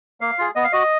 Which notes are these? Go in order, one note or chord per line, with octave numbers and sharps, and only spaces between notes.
A#3 F5
F4 G#4
B3 D#5
F5
F#4 D#5